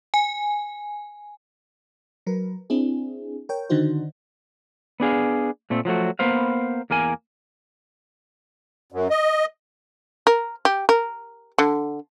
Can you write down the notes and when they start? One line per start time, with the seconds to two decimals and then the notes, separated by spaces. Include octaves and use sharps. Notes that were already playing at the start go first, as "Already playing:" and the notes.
0.14 G#5
2.27 F#3 A#4 B4
2.70 C4 D4 E4 G#4
3.49 A#4 C#5 G5
3.70 D3 D#3 D4 D#4 F#4 C5
5.00 B3 D4 G#4 F5
5.70 A#2 A3 C4
5.85 F3 F#3 A3 F#4
6.19 A#3 B3 B4 C5 F5
6.90 E2 A#3 A#4 G#5
8.92 F#2
9.10 D#5
10.27 A#4
10.65 G4
10.89 A#4
11.58 D3